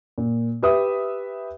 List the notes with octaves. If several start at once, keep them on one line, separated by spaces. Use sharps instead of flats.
A#2
G4 B4 E5 D#6